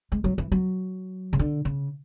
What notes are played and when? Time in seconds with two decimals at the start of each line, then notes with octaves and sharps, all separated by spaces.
0.12 G#3
0.24 F#3
0.38 E3
0.52 F#3
1.33 C#3
1.39 D3
1.65 C#3